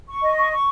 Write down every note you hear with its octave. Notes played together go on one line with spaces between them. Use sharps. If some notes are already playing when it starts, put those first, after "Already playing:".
C#6
D#5
C#6
C#6